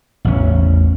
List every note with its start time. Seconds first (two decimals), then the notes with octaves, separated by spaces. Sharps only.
0.25 A1 E2 C#4